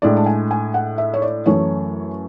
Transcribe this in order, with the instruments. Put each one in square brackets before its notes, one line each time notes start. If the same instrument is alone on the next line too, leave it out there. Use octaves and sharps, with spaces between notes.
[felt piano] A2 G#3 D4 D5
A5
G#5
G#5
F#5
E5
C#5
D5
F#2 E3 A3 C#5